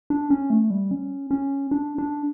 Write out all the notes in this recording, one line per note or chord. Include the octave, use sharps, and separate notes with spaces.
D4
C#4
A3
G3
C#4
C#4
D4
D4